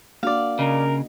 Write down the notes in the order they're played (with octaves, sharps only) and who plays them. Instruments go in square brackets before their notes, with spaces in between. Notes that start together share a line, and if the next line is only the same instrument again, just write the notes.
[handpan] A#3 D4 F#4 [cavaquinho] D5 F5
[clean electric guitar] C#3 [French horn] A#4 [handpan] D#5